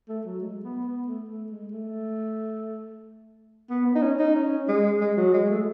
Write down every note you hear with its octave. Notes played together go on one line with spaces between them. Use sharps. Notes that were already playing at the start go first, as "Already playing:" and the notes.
A3
F#3
G#3
B3
B3
A3
A3
G#3
A3
B3
B3
D#4
C#4
D#4
C#4
G#3
G#3
F#3
G#3
A3